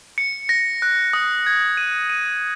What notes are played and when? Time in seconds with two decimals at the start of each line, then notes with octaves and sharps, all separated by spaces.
0.18 C#7
0.49 A#6
0.82 F#6
1.13 D#6
1.46 G#6
1.77 D#7
2.10 D#7